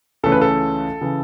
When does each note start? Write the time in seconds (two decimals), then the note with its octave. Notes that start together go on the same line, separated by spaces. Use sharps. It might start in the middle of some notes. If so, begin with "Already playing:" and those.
0.23 C#2 C#3 E3 A3 C#4 A4
0.32 B4
0.41 A4
1.01 C#3 E3